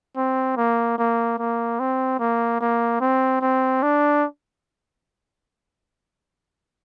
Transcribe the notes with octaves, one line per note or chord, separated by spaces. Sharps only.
C4
A#3
A#3
A#3
C4
A#3
A#3
C4
C4
D4